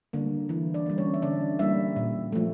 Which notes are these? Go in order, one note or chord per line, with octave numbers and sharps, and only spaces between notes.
D3 G3 A#3 D4
D3 E3 E4
D4 D5
G3 A#3
C#4 C#5
E5
D3 D4 D5
G3 A#3 E4 E5
A#2
F3 A3